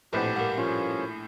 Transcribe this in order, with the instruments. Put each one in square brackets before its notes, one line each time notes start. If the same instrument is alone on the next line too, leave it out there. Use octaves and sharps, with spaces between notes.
[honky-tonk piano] A#1 A2 [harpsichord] F2 [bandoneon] G4 A5 [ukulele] B4 C5 F#5
[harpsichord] G2 A#3 [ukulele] F#5
[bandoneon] F3 C#4 [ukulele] F4